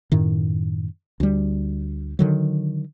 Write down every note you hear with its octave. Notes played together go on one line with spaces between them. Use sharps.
F#2 A2 D#3
D2 G3
D3 D#3 F#3